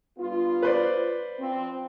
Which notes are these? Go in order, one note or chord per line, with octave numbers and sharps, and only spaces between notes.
G2 B3 F4
B4 C5 D5
F3 C4